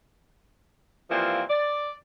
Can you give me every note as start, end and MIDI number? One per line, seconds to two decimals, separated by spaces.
1.10 1.43 52
1.10 1.43 53
1.10 1.43 55
1.10 1.43 58
1.10 1.43 60
1.10 1.43 65
1.50 1.93 74